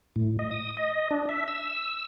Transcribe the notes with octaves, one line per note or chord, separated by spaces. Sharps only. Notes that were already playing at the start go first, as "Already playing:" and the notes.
A2
D#5
D#6
D#5
D4
E5
E6
E6